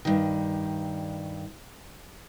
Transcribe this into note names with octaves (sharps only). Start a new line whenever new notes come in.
G2 D#3